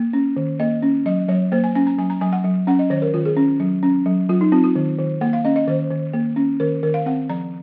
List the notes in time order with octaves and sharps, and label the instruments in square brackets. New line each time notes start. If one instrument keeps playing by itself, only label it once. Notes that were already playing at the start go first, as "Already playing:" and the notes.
Already playing: [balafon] A#3
C#4
D#3
A#3 D#5
C#4
F#3 D#5
F#3 C#5
A#3 C5
G#5
C#4 G#5
A#5
F#3 G#5
A#5
F#3 G#5
F#5
F#3
C#4 F#5
D#5
D#3 C#5
A#4
D#3 F4
G#4
C#4
F#3
C#4
F#3
F#3 F4
D#4
C4 F4
F4
D#3
D#3
A#3 F#5
F5
C#4 D#5
D#5
D#3 C5
D#3
A#3
C#4
D#3 A#4
D#3 A#4
F5
C4 F#5
F3 A#5